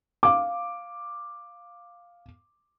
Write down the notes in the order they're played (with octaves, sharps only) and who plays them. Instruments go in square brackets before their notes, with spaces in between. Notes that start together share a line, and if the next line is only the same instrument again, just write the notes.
[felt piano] F5 D6